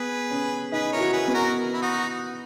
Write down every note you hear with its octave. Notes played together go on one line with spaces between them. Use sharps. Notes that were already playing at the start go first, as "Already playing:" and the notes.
Already playing: B3 G#4 B4
C#4
D#4 G#4 B4
E4 A#4 C#5
F#4
G#4 B4
B3
F#4 A#4
E4
D#4 F#4